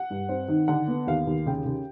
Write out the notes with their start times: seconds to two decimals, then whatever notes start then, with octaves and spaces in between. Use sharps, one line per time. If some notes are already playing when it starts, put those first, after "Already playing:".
Already playing: F#5
0.11 G2
0.29 C4
0.48 D#3
0.68 D3 F#5
0.88 B3
1.07 D#2 F5
1.27 D#2
1.46 C#3 G5
1.66 C#3